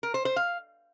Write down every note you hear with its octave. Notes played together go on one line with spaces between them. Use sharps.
A#4
C5
C5
F5